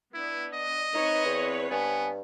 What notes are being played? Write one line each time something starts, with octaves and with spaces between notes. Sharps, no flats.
B3 D4 E4
D#5
C4 D#4 B4 C#5
E2
G2 B3 G#5